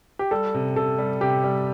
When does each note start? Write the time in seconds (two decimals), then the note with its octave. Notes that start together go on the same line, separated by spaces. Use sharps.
0.19 G4
0.31 G3 A4
0.54 C3
0.76 C3 A4
0.98 G3
1.21 C3 G4
1.44 G3